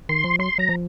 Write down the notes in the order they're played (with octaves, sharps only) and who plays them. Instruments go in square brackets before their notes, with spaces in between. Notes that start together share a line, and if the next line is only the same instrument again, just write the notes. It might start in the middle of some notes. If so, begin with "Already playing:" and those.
[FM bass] D#3 [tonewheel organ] C6
[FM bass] F3
[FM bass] F#3 [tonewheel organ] C6
[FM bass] F#3 [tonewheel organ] A#5
[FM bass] F3